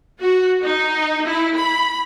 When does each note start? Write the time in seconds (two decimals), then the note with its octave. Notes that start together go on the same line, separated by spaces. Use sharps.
0.21 F#4
0.62 D#4
1.25 E4
1.56 B5